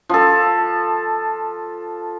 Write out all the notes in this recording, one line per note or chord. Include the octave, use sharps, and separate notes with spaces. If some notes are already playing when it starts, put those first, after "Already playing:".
F3 A4